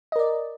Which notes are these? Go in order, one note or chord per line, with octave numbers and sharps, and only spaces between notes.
A#4 D5 D#5